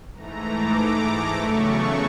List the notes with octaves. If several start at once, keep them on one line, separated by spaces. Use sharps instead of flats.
G#2 E3 A3 A#5
D6
D6
E2 C#3 F#3 A3 C#6